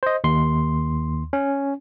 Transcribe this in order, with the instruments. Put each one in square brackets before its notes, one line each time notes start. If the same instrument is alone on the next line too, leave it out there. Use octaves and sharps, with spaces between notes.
[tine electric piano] C5 D#5
D#2 C6
C#4